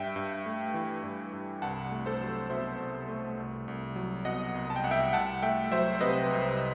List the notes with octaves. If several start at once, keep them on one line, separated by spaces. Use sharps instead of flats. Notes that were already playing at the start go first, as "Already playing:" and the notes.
Already playing: G2 E5 G5
G2
A3
E3
G2
G2
C2 F#5 A5
A3
A4 C5
F#3
B2 C5 E5
C2
A3
C2
C2
F#3
B2 D#5 F#5
C2
A5
G5
C2 F#5
E5 G5
C2 F#5 A5
A3 E5 G5
F#3 C5 E5
C3 B4 D#5
C2